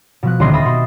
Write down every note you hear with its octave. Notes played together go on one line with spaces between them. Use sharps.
B2 F3 F#6
D#1 D2 C4 G4 D#5 C6
D#5 E5 B5 D#6 A6 A#6
B2 C6